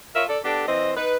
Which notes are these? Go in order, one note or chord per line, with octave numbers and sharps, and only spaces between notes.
F4 A#4 C#5 E5
A4 D5
B3 D4 G4 A4
E3 C4 C5 D#5
D#4 B4